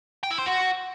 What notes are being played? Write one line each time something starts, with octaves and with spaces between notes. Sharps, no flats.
G5
E4
C5
F#4